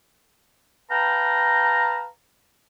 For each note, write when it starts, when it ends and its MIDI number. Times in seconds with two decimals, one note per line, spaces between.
0.91 2.08 71
0.91 2.08 77
0.91 2.08 79
0.91 2.08 81
0.91 2.08 82